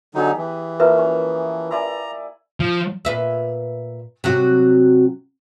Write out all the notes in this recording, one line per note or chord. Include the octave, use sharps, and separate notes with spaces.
D3 F#3 B3 D#4 G4 G#4
E3
F3 A#3 A#4 B4 E5 E6
C#4
E4 D5 G#5 A#5
F3
A#2 B4 E5
C3 F#3 F#4